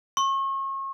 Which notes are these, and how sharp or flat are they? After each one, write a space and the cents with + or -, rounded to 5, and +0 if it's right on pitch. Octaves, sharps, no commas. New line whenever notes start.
C#6 -35